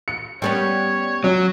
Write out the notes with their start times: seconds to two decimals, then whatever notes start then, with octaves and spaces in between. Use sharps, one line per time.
0.08 C#7
0.42 G3 B3 C#4 C#5
1.24 F#3 C#4